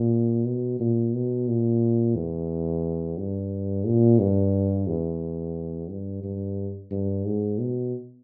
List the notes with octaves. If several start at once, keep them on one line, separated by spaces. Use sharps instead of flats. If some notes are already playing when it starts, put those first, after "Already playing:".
Already playing: A#2
B2
A#2
B2
A#2
E2
G2
A#2
G2
E2
G2
G2
G2
G#2
B2